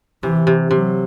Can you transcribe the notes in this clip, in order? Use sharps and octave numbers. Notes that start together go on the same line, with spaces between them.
C3 E3
C3
C3 F#3